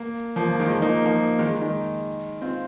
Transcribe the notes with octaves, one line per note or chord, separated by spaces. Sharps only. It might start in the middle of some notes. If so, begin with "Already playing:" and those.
Already playing: A#3
F3 A#3
F3
D#3 G#3
F3
A#3 D#4
F3 A#3
D#3 G#3
D#3 G#3
C4 F4